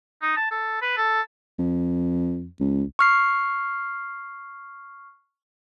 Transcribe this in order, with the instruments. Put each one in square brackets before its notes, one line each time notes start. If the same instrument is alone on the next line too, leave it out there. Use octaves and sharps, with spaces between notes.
[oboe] D#4
A5
A4
B4
A4
[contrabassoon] F2
C#2
[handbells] C#6 F6 C7